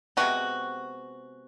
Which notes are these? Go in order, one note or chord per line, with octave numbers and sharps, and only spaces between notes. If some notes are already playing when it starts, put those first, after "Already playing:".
C3 E3 G#3 B3 F#4